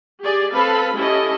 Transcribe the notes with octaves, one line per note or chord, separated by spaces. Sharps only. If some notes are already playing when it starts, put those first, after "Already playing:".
G4 G#4 D5
C4 A4 B4 F5 B5
C#4 E4 G4 A4 D#5